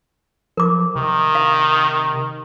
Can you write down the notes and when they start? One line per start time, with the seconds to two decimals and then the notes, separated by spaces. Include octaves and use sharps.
0.57 F3 A#4 D6
0.96 C3 D#3
1.35 F5